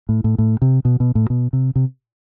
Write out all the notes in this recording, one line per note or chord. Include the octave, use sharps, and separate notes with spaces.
A2
A2
A2
C3
B2
B2
A2
B2
C3
C3